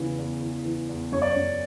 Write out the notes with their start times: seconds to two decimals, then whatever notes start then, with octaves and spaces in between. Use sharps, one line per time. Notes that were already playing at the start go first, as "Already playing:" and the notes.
Already playing: E2 C#3 E3
0.18 E2
0.42 E3
0.65 E3
0.89 E2
1.12 F#2 C#5
1.22 D5
1.30 C#5
1.36 F#2